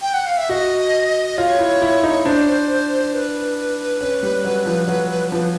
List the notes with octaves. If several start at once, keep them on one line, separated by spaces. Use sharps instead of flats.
G5
F#5
F5
E5
F#4 D#5
F4 C#5
E4
E4
D#4
D4 C5
B4
C#4
G3
F#3
F3
F#3
F3